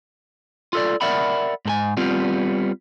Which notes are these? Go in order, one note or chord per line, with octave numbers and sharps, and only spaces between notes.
F4 A4 D5
A#4 D5 E5 F#5 B5
G#2 A4 G#5
G3 B3 C4 F4